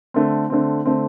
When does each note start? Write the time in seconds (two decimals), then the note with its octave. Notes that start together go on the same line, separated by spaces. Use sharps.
0.14 D3 A3 C4
0.50 D3 A3 C4
0.85 D3 A3 C4